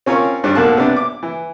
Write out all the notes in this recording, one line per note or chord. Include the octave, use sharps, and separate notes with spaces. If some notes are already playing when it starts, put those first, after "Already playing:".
C4 C#4 F4 A#4 C#5
G2 G3 C4 D4
B1 A#3 F5 A5 F#6
C3 B3 D4
D6
E3